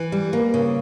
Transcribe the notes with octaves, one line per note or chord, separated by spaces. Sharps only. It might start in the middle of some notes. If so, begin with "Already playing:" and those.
Already playing: E3
G3
A#3
C#3